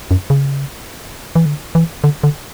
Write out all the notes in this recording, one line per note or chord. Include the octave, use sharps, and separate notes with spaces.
F#2
C#3
E3
D3
E3
D3
D3